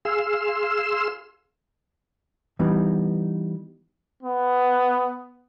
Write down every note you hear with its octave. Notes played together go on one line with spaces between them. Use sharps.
G#4 F5 C6 E6
E3 G3 B3 D#4
B3